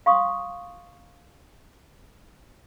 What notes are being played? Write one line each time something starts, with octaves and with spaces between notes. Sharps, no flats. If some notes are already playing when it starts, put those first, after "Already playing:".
F5 C6 C#6 D#6